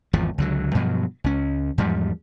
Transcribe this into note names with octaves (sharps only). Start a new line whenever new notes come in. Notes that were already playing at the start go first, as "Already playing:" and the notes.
G#1 E2 F3
C#2 D3 F#3
G2 B2 F3 F#3
C#2 C#4
E2 G#2 F3 G3